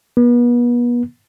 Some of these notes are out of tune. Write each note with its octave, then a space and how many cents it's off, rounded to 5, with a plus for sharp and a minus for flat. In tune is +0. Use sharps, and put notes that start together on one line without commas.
B3 -35